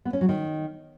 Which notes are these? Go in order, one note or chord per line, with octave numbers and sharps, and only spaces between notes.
B3
C#4
F#3
D#3